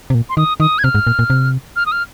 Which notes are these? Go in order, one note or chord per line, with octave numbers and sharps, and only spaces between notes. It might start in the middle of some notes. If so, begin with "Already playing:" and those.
C3
A#2
C6
D#3 D#6
D#3 D#6
G#6
C3 F6
G#2
A#2
A#2
C3
F6
D#6
F6